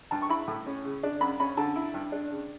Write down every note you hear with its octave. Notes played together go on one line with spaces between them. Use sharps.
G2 A5
C#6
E4 B5
A2
C#4
C#3
D4
F#2 B5
C#4 B5
D3 A5
E4
G2
D4
C#3